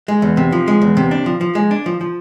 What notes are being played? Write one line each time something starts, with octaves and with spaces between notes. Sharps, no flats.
G#3
E2
C3
F3
G#3
E2
C3
D4
F3
F3
G#3
D4
F3
F3